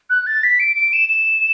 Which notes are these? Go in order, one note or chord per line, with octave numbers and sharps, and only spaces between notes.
F#6
A6
B6
D7
D7
E7
E7